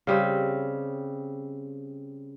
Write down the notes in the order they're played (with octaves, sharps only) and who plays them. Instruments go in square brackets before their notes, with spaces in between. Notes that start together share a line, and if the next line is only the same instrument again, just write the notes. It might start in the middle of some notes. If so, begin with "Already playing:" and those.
[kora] C#3 G3 C4